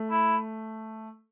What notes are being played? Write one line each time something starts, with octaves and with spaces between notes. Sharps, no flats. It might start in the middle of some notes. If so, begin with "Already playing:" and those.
Already playing: A3
E4